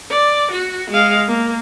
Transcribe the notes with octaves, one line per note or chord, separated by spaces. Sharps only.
D5
F#4
G#3 F5
A#3